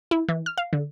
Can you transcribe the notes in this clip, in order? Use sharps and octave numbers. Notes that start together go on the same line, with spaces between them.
E4
E3
F6
F5
D3